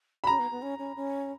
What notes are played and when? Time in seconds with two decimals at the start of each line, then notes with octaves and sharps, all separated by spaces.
0.24 B5
0.27 C#4 A#5
0.39 B3
0.51 B3
0.62 C#4
0.79 C#4
0.96 C#4